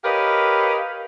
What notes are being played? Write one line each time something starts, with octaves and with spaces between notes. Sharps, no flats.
G4 A#4 B4 C#5 D#5 F5